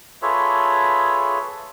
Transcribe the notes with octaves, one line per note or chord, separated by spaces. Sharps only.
F4 G#4 A4 B4 C#5 E5